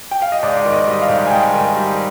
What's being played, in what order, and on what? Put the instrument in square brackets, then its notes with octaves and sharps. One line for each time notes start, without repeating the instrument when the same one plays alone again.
[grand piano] G5
F5
D#5
G#2 D5
D#3
D#5
G3 D#5
F5
G#2
G#5
G#2 G5
D#3
G3